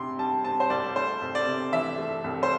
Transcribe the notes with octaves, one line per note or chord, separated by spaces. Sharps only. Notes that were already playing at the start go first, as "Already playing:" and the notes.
Already playing: C2 C3 C6
G3 A5
C4 A5
C5
C2 D5
A3 C5
C2
D5
C3
E3 E5
A3
C2
C5